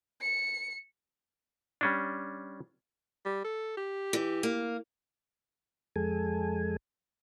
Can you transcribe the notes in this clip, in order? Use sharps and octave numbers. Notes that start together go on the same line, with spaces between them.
C#7
G3 C#4 D4
G3
A4
G4
E3
A#3
F2 G#3 A4 G#5